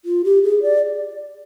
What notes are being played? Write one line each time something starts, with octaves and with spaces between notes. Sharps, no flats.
F4
G4
G#4
D5